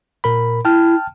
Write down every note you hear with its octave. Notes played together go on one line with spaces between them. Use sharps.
A#2 A#4 B5
E4 G5 A5 F6